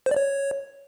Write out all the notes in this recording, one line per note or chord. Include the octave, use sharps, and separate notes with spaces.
C5
D5
C#5